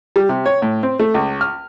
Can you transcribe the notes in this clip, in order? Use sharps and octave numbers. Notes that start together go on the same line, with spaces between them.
G3
C3
C#5
A2
C4
A3
C#2
F6